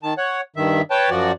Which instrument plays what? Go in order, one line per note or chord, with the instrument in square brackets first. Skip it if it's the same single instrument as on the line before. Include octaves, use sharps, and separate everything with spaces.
[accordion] D#3 A5
C#5 F#5
G2 D#3 E5
B4 C#5 G5 A5
F#2 F3 F#4 D5